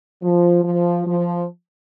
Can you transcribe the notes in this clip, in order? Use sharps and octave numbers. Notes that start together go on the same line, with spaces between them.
F3
F3
F3